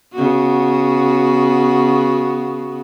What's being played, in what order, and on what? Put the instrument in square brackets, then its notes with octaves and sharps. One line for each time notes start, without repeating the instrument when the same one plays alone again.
[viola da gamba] C#3 B3 F#4